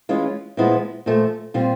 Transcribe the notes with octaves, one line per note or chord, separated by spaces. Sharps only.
E3 G#3 C#4 F4
A#2 F3 G#3 B3 E4
A#2 F3 A3
A#2 G3 C4 F4